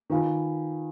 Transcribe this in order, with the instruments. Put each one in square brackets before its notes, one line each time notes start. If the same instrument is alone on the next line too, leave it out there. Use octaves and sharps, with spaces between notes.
[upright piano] D#3 [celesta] F4 B4 F5 G#5 B5